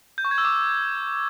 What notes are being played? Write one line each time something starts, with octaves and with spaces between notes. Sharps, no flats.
G6
C#6
G#6
E6
D6